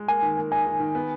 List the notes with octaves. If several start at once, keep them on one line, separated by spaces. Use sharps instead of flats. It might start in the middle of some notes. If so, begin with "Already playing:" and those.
Already playing: G#3
A#3 G#5
D#3
A#3
D#4 G#5
D#3
D#3
B3